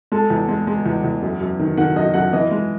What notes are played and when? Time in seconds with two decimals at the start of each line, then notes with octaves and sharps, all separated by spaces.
0.12 G#3 A4
0.30 E2
0.49 G#3
0.67 G#3
0.86 E2
1.04 E2
1.23 F#2
1.41 F#2
1.59 D#3
1.77 D#3 F#5
1.96 F#2 D#5
2.14 F#2 F#5
2.33 E3 D#5
2.51 G#3